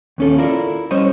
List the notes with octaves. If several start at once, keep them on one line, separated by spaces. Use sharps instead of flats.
D#2 C#4 A4
E4 F4 A4 A#4 D5 E5
G3 C#4 C5 C#5 D#5